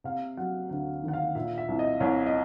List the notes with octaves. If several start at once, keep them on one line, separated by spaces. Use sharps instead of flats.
C3 F5
F#3 F#5
D2 F#5
D#3 F#5
F5
A#2 E5
E5
C2
D#5
C2 C#5
D#5